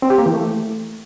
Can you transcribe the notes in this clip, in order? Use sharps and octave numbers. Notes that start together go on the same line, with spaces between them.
C4
G4
A#3
E3
A3